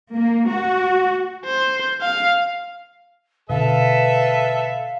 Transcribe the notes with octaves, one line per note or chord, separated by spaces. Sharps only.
A#3
F#4
C5
F5
B2 D3 A4 B4 E5 F5